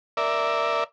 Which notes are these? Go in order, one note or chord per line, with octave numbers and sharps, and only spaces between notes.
A#4 D5 E5